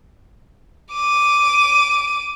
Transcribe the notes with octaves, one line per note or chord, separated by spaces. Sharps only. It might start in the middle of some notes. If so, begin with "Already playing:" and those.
D6 D#7